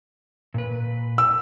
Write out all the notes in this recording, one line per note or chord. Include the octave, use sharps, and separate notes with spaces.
A#2 B4
E6